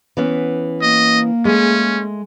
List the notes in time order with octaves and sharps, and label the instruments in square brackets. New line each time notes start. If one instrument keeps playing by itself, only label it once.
[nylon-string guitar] E3 B3 C#4
[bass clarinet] A#3 [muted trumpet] D#5
[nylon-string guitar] G#3 A3 [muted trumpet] C#4